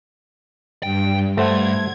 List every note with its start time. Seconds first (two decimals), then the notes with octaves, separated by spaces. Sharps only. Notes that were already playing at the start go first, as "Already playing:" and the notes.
0.83 G2 G5
1.37 G2 A3 C5 F#5 G#6